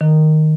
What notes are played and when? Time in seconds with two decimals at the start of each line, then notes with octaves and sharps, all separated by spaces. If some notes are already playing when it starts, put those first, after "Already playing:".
0.01 D#3